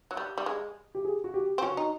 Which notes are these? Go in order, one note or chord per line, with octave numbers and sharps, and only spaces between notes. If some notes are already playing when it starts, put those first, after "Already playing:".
F#3
G3
G3
G#3
G4
G#4
F#4
G4
C4
C#4 F#4
D#4